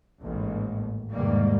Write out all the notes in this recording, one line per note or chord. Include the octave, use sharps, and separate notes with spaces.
A1 D#2 G#2
E2 G#2 C3 D#3 G3 A#3